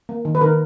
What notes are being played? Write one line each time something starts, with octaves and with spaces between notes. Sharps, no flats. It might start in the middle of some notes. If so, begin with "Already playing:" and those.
A#3
D#3
B4
D#3 A#4